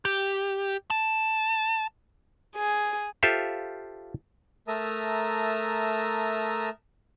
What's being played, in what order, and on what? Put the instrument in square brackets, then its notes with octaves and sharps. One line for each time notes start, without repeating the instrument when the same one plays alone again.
[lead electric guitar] G4
A5
[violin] G#4
[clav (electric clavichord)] F4 G4 A4 C5 E5 F5
[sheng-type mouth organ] A3 A#4 E5 A5 A#5 D#6